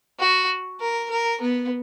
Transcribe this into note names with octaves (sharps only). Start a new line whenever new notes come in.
F#4
A#4
A#4
B3